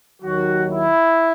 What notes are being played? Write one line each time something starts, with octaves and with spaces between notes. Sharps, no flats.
D#2 D#3 F#3 F#4
E4